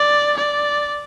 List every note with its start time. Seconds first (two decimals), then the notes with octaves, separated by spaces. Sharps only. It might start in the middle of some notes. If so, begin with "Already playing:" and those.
Already playing: D5
0.37 D5